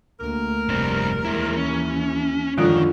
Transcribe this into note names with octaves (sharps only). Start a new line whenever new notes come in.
D2 A#3 A#4
F1 G2 C3 C4
D#2 E3 G#3 E4
C#4
F#2 D3 D#3 F3 G3 G#3 C#4 F4